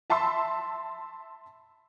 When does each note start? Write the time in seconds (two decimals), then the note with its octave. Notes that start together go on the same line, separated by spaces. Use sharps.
0.10 E5 A5 B5 C6 E6